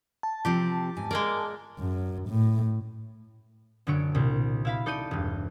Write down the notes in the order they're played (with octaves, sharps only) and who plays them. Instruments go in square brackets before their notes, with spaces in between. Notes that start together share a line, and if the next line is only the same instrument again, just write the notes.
[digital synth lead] A5
[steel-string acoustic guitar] C3 F3 C4 [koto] G4
[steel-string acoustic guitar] E2 G#2 G#5
[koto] G#3 A#3 D5 [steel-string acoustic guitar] A#4
[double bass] F#2
A2
[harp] F#1 D3 F#3 C#5 D7
C2 A#2
E4 F5 B5
D#4 A4 D5 G6 D#7
E1 G2